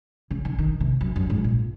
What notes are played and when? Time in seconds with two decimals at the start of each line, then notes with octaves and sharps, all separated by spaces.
0.31 C#3
0.45 D#3
0.59 D#3
0.80 C3
1.01 F#2
1.16 F#2
1.30 G#2
1.44 A#2